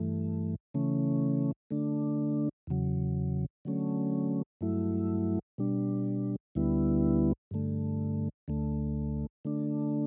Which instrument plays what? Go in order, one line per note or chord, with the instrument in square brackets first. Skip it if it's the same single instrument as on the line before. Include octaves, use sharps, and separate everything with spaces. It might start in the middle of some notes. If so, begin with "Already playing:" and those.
Already playing: [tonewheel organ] G2 E3 A3
C#3 E3 A3 C#4
D3 A3 D4
E2 C#3 F#3
D3 F#3 A3 C#4
G2 F#3 A3 E4
B2 G3 D4
D2 D3 G3 B3 E4
G2 D3 A3
D2 D3 A3
D3 A3 D4